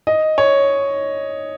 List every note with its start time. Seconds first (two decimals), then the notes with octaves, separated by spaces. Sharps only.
0.07 D#5
0.38 C#5